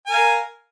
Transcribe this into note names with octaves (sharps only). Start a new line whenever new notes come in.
A#4 F5 G#5